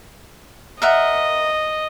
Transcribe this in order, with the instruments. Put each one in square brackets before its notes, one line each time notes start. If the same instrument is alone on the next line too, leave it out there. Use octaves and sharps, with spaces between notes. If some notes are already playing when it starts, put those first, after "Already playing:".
[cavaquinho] A#4 E5 F#5 [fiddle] D#5